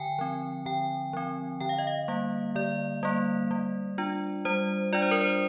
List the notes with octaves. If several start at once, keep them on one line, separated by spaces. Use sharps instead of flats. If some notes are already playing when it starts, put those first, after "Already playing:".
Already playing: D3 G5 G#5
F3 C4
D3 G5
F3 C4
D3 G5
F5
D#5
F5
G3 A#3
D3 D5
G3 A#3
G3
D4 F4
G3 C5
D4 F4 D5
C5
A#4
C5